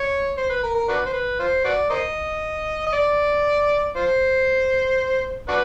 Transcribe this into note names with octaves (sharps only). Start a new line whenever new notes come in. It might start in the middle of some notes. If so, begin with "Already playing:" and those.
Already playing: C#5
C5
B4
A#4
A#4
D4 F#4 B4
C5
B4
F4 C5
F#4 B4 D5
A#4 C5 D#5
D#5
D5
F4 C5
D4 F#4 B4